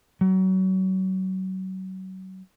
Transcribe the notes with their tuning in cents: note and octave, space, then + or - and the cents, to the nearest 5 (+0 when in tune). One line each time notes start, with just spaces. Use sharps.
F#3 +30